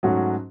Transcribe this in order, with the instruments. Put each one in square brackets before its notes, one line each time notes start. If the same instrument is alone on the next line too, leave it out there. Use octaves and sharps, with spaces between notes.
[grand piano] G#2 F#3 A3 C#4 F#4